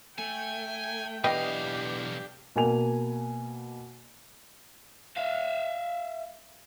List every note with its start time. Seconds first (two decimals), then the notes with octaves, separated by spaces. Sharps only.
0.19 A3 G5 G#5
1.24 B1 E2 D4 G4 B4 D#5 F5 G5
2.56 B2 A#3 G#5 F7
5.16 E5 F5